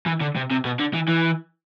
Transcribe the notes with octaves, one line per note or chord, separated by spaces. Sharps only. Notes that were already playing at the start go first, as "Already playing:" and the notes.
E3
D3
C3
C3
B2
D3
E3
E3